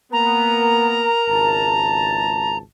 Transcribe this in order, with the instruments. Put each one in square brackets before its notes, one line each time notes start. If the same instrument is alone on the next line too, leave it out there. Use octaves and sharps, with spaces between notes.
[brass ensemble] A#3 B3 [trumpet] A#4 [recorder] A#5
[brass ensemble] G#1 C#2 A5